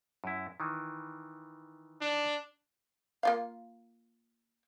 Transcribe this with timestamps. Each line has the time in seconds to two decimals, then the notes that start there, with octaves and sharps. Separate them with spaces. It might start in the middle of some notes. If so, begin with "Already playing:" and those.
0.24 F#2 E4
0.60 D#3 E3
2.01 D4
3.23 A#3 F4 F5